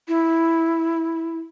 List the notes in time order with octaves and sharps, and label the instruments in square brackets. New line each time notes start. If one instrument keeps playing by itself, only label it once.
[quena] E4